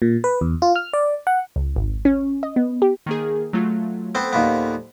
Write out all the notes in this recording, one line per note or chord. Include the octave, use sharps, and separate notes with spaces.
A#2
B4
E2
F4
F6
D5
F#5
C#2
G#1
C#4
D#5
B3
G4
D#3 A#3 G#4
F#3 A3 F4
B3 C4 A4 C5
D#2 A#2 B3